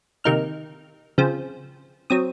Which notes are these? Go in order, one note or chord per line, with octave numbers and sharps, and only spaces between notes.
C3 D#3 A#3 D#4 F6
C#3 F3 C4
F#3 C4 D#6